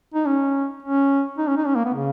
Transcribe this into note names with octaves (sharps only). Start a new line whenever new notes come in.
D#4
C#4
C#4
D#4
C#4
D#4
C#4
A#3
B3
C#3